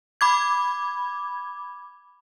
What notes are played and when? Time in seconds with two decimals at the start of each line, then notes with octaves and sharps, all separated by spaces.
0.21 B5 D6 G#6